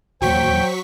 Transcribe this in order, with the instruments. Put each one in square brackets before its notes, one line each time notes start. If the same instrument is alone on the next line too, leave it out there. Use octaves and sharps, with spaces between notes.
[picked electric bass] D#1 E2 A#3 [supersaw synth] F#3 C#6 B6 [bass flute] C5 [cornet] G5